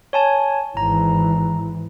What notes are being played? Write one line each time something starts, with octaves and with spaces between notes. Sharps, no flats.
C#5 G#5 A5
G#1 E3 A#5